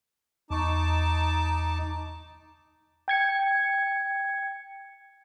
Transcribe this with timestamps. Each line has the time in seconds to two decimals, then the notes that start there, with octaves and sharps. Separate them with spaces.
0.51 E2 D#4 A5 C#6 D6
3.08 G5 G#6 C#7